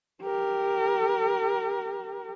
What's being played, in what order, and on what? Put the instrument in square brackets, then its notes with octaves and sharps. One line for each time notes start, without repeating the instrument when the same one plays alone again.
[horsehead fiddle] G4 A#4